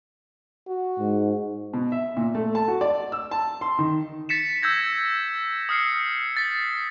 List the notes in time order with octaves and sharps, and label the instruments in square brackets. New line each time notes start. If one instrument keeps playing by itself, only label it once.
[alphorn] F#4
[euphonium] G#2
[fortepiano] B2
E5
A#2
A3
A5
F#4
D5
E6
A5
C6
D#3
[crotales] A6 B6 C#7 E7
E6 G6 G#6 A#6
D#6 F6 C7 C#7
A6 B6